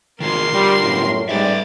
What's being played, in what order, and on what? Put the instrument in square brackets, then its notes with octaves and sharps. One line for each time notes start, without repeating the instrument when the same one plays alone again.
[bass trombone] G#1 [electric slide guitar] D#3 F4 G#4 [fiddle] A#4 C6
[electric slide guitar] D3 F4 [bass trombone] G3
[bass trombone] G1 [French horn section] F#2 A2
[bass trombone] G#2 [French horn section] G3 [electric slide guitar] A4 B4 E5 [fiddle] D5